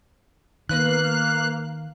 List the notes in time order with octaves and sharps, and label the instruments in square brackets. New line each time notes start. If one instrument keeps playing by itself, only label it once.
[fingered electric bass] D#3 [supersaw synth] A#3 F5 [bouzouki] B3 B4 A#5 [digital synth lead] F#6